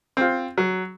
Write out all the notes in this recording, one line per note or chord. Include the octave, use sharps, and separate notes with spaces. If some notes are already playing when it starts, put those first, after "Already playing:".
C4 F4
F#3